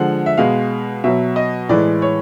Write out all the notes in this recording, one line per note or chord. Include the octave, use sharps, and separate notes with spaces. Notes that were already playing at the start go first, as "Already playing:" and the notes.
Already playing: D3 F3 G#3 F#5
E5
B2 G#3 F5
B2 F#3 E5
D#5
A2 E3 G#3 D5
C#5